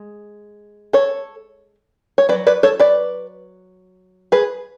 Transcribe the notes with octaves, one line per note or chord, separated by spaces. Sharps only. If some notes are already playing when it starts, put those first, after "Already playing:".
Already playing: G#3
A4 C#5
C#5
C#4 B4 D5
F#3
B4 D5
A4 C#5
B4 D5
G#4 B4